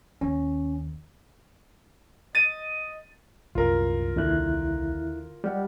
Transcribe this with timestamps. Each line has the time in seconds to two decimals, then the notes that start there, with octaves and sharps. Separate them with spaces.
0.21 D#2 C#4
2.35 D#5 A6 D#7
3.55 C2 F#2 A#2 F#3 F4 A#4
4.16 D#2 D3 E4 F#6
5.44 G3 D#5 F#5 F6